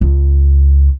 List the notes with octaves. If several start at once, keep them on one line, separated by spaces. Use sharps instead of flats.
C#2